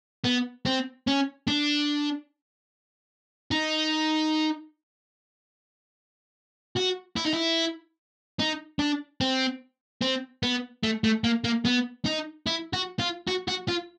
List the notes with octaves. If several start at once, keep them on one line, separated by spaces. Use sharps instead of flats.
B3
C4
C#4
D4
D#4
F#4
E4
D#4
E4
D#4
D4
C4
C4
B3
A3
A3
A#3
A#3
B3
D#4
E4
F#4
F4
F#4
F#4
F4